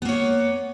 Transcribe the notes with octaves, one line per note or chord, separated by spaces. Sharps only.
A#3 B3 C#5